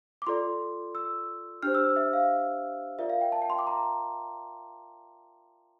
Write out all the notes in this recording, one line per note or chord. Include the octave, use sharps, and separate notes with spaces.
D6
F4 A4 D5 C6
E6
D4 G4 C5 F6
E6
E5
F5
F4 A#4 D5 E5
F5
G5
A5
G5
C6
D6
A#5